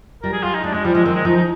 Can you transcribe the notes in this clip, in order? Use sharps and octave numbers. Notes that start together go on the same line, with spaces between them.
G3 A#4
G#4
G3 F4
D#4
G#3 D4
G3 G#3
F3 G3
F3 G#3
D#3 C4
G#3
F3 D#4
D#4